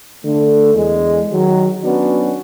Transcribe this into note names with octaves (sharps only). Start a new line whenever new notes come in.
D3 A3
E2 G#3
D#3 F#3
F#3 B3 C#4 D4 F#4